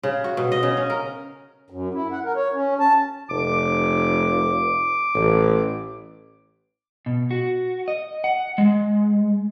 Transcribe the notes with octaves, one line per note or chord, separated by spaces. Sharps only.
C#3
F#4
B2
D#5
C#3
C#4
A#4
F#2
E4
F#5
A#4
C#5
C#4
A5
F1 D6
A1
B2
F#4
D#5
F#5
G#3